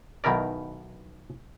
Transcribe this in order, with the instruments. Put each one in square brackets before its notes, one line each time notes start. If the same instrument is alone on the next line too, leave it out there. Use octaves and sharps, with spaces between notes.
[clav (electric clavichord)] B1 B2 D#3 E4 A#4 D5